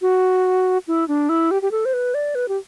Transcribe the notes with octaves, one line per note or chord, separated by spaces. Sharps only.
F#4
E4
D4
E4
G4
G4
A4
C5
B4
D5
B4
G4